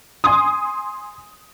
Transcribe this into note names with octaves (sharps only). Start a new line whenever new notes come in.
G#5 C6 D#6